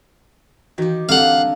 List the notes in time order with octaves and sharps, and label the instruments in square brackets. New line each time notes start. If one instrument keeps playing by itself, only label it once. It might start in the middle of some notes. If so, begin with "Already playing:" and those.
[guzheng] D#3 G4 [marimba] E3 F#4
[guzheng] D3 A#3 [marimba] C4 G4 A4 [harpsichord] F5 F#5